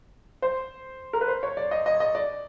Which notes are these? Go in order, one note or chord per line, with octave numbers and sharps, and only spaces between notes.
C5
A#4
B4
C5
C#5
D5
D#5
D#5
D#5
D5